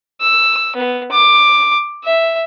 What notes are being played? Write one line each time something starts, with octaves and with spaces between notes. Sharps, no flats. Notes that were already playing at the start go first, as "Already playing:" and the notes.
E6
B3
D6
E5